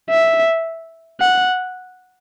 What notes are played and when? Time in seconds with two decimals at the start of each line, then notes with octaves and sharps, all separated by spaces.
0.10 E5
1.20 F#5